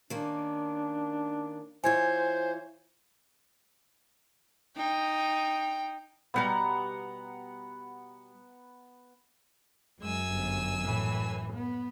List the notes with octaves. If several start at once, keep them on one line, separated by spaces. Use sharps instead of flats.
D#3 A#3 C#4 D4
E3 F4 C5 C#5 G#5 G#6
D#4 G5
B2 G3 B3 F5 F#5 A#5
F#2 G#3 G#5 E6
G1
A2 E3
B3